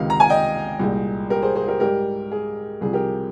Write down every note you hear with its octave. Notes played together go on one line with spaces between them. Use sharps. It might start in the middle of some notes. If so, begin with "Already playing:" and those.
Already playing: C#2 C3 D#3 F5
A#5
G#5
D#5 G5
C2 A#2 G#3
G4 A#4
G#4 C5
G#4 C5
G4 A#4
G#2 G3 G4 A#4
G#4
C2 C3 F3 G#4
G4 A#4